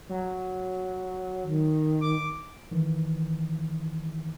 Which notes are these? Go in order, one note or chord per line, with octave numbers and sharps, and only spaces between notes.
F#3
D#3
D6
D#3 E3